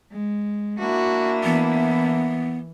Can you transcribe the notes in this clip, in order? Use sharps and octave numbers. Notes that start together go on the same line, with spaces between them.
G#3
A#3 D4 E4 F#4
E3 B3